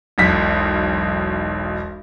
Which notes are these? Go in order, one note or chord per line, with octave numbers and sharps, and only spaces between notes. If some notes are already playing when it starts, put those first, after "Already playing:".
E1 B1 B6